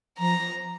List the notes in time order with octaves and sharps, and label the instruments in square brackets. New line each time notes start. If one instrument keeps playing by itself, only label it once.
[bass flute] F3 [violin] A#5